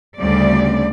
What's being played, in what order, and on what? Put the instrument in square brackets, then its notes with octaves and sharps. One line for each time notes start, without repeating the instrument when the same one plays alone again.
[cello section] D2 C#3 G3 C4 D5